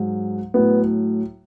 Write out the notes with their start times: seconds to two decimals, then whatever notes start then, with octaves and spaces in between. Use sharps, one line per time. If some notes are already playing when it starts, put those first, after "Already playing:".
Already playing: G#2 F#3
0.54 A2 F#3 B3